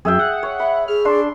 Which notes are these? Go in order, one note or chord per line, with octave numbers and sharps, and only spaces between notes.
F#2 G#4 E5 G5
F#5
C#5
E5 B5
G#4 F6
D4 C6